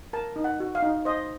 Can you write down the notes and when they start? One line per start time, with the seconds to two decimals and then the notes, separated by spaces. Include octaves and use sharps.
0.13 A#4 A5
0.36 D#4
0.44 F#5
0.60 F#4
0.75 F5
0.83 D#4
1.05 C5 D#5